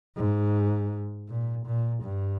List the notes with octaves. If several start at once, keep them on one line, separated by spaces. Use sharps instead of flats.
G#2
A#2
A#2
G2